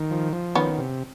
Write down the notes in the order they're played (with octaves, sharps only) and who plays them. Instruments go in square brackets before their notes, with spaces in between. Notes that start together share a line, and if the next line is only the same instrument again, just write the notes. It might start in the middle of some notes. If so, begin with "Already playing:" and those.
Already playing: [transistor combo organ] D#3
F3
F3
[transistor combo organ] D#3 [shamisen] B3 C#4
[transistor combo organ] C3